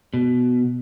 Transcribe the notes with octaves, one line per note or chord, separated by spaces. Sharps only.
B2